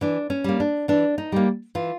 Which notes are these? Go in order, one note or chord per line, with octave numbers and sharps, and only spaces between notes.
E3 D4
C#4
G3 A#3
D4
E3 D4
D#4
G3 A#3
E3 F4